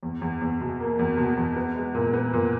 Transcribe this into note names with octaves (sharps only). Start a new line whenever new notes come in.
E2
E2
E2
B2
A#3
E2
B2
E2
B3
G#3
A#2
B3
A#2